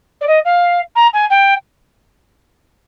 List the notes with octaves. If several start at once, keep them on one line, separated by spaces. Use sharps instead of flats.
D5
D#5
F5
A#5
G#5
G5